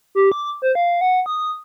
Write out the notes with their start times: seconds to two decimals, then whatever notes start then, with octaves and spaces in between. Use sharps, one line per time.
0.15 G4
0.32 D6
0.62 C5
0.75 F5
1.01 F#5
1.26 D#6